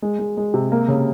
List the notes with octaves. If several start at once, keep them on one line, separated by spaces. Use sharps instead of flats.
G#3
G#3
G#3
C3
A#3
C#3